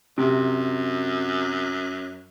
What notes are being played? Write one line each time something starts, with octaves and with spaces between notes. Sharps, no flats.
F#2 C3